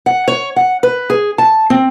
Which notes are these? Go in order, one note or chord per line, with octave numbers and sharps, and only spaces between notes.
F#5
C#5
F#5
B4
G#4
A5
C4